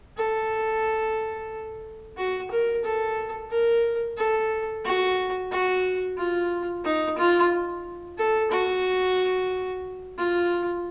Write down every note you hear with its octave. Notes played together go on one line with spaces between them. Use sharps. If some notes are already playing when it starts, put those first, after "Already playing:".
A4
F#4
A#4
A4
A#4
A4
F#4
F#4
F4
D#4
F4
A4
F#4
F4